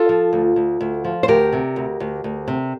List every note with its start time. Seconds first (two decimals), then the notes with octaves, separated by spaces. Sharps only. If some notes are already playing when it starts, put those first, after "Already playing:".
Already playing: F4 A4
0.09 F3
0.33 D2
0.56 D2
0.81 D2
1.04 F3
1.23 C5
1.28 D2 G4 A#4
1.53 C3
1.76 D2
2.00 D2
2.24 D2
2.48 C3